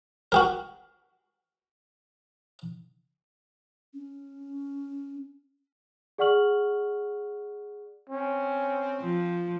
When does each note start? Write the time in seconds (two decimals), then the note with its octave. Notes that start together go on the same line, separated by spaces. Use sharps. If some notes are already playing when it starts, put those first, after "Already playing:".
0.32 F#4 G4 A#4
3.94 C#4
6.18 G#4 D5 F#5 C#6 F6 F#7
8.10 C4 C#4
9.01 F3